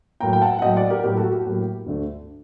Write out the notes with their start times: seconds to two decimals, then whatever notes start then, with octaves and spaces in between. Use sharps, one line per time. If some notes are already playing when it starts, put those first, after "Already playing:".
0.20 A2 F#3 A#3 G5 A#5
0.33 G5
0.42 F#5 A5
0.59 F#5
0.62 A2 F#3 A#3 D#5 G5
0.76 D5 F#5
0.90 G4 A#4
1.03 A2 F#3 A#3 G4 A#4
1.17 F#4 A4
1.31 G4
1.46 A2 F#3 A#3
1.86 D2 D3 A3